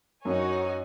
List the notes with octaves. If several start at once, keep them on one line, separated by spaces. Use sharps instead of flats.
F#2 D#4 F#4 C#5 G#5